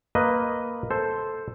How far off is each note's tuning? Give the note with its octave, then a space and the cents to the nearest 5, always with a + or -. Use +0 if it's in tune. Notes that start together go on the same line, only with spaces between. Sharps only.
A#3 +0 B4 +0 D#5 +0
A4 +0 C5 +0